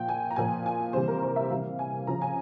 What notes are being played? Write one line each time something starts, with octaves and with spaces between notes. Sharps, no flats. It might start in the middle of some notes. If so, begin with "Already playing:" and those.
Already playing: A#2 F3 G5
G#5
A#5
A#2 F3 G#5
G#5
C3 E3 G3 C5
A#4
C5
E5
C3 E3 G3 F5
G#5
C#3 F3 A#5
G#5